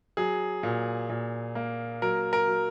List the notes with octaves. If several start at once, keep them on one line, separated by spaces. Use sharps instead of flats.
F#3 G#4
A#2
A#2
A#3
F#3 A#4
A#4
F#3